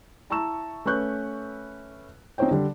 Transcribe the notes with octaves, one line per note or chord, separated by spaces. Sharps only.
E4 A5 A#5 C#6 E6 E7
A3 C#4 B4 C#6 F#6 G6
C4 D#4 F4 C5 C#5 G5
D3 G3